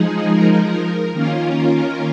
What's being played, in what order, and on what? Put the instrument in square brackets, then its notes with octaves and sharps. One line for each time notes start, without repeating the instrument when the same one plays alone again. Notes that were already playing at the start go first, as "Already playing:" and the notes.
Already playing: [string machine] F3 G#3 D#4 G#4
A#4
D#3 A#3 C#4 F4 A#4